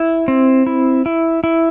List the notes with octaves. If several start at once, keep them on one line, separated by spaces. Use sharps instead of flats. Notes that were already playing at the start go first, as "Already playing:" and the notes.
Already playing: E4
C4
E4
E4
E4